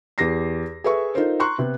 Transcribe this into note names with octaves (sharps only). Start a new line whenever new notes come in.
E2 G4 A#6 C7
G#4 A4 B4 E5 C#6
D#4 F4 A4 A#4 C5
A#5 C6 C#6 F#6
C3 B3